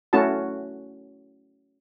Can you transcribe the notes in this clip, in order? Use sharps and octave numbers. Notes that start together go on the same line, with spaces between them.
A3 C#4 E4 F#4 A5